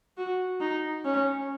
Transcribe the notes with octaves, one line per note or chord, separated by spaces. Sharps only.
F#4
D#4
C#4